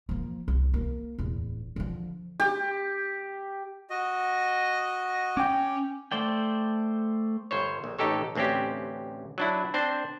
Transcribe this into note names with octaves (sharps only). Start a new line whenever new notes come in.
F3 A#3
C2
A#3
D1 E2
D3 F3
G4
F#4 D#5
C#4 G5 D6
A3 C5 D5 G5
G1 C5 C#5
A#1
A1 D#4 G4 A4 C#5
A1 D2 C4 C#4 G4
F#3 D4 E4
C4 D4 C5